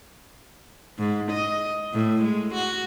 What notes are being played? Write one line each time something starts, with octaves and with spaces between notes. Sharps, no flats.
G#2
D#5
A2
G#3
F#4